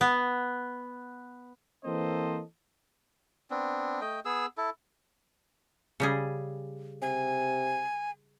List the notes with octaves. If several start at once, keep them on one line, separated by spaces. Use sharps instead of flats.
B3
E3 A#3 C4 A4 C5 D#5
B3 C4 D4
A3 D#5 G5
B3 G#4 E6
E4 A4
C#3 G3 G#4
C3 G#5